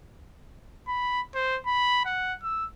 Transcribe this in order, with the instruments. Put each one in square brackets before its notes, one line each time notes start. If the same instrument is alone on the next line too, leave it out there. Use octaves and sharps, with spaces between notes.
[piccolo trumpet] B5
C5
B5
F#5
E6